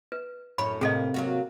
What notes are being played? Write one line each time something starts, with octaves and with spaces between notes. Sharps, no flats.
B4
F#2 A2 C#5 B5
A2 C3 A#3 G#4 A4 D#5
F#3 A#3 F#4